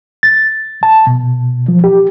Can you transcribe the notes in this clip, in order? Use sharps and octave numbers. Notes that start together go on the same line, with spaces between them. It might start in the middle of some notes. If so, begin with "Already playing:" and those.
A6
A5
B2
F3
G4